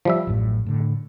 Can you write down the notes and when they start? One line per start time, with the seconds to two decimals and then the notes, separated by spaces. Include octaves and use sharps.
0.05 F3 G3 E5
0.27 A1 F#2 A2
0.66 A2 D3